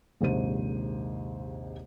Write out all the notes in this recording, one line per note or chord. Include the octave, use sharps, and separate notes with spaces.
A#1 D#2 G#2 C3 C5 D#7